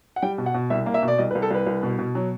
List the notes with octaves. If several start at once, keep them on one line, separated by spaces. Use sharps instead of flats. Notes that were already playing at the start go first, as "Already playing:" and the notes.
F#5
G3 G5
B2
F#5
B2
C2 E5
A#3
E5
B2
D5
C2 D#5
B4
C2
A4
C2 B4
C2
B2
B2
F#3